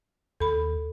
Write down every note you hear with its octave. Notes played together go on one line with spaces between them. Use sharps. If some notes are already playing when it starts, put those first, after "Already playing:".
D#2 A4 B5